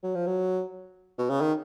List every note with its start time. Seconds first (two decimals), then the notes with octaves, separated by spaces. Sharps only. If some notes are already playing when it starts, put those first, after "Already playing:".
0.03 F#3
0.15 F3
0.27 F#3
1.18 B2
1.30 C#3
1.41 D#3